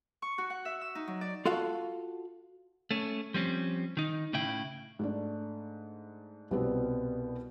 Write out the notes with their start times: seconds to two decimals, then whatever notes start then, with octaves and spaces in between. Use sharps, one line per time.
0.22 C#6
0.38 F#4
0.50 F#5
0.65 E5
0.81 E6
0.95 D#4
1.07 F#3
1.21 D5
1.46 F4 F#4 A4 F5
2.91 A3 C#4
3.34 F3 G3 C4 C#4
3.97 D#3 D#4
4.33 A2 C#3 E4 G5
4.99 G#2 A3 D4
6.51 C2 B2 G3 B3 C4 C5